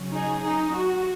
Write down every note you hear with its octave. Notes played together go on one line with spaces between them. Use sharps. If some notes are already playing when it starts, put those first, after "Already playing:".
Already playing: C#3 F#3 C#4
D#4 G#4
D#4
F#4